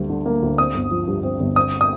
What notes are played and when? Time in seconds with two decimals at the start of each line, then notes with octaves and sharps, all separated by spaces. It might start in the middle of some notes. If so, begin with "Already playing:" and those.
Already playing: D2 G3 A#3
0.09 D3
0.26 A#3
0.42 D2
0.58 C4 D#6
0.75 G1
0.91 F3
1.07 G2
1.23 C4
1.40 G1
1.56 C4 D#6
1.81 D#6